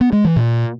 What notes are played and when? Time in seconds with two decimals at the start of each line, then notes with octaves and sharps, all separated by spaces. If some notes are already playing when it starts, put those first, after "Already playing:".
0.01 B3
0.13 G#3
0.24 E3
0.36 A#2